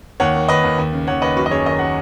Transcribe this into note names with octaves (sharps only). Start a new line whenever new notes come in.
D#2 C#5 F#5
D#3
D#2 B4 D#5
D#2
D#2
C#3
D#2 C#5 F#5
D#2 B4 D#5
F#2 F#4 B4
D#5
F#2 G#4 C#5
D#3 D#5
D#3 F#5